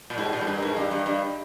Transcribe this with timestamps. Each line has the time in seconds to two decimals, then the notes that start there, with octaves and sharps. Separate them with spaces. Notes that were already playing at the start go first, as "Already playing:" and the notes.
0.10 A#2
0.18 G#2 D#4 G4
0.33 A#2
0.41 G#2
0.47 G2 B4
0.57 A#4
0.62 G#2 G#4
0.76 G2 D#4 G4
0.91 G2
1.06 G2